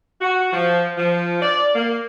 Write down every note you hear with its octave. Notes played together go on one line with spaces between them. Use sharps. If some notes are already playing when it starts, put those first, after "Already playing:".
F#4
F3
F3
D5
A#3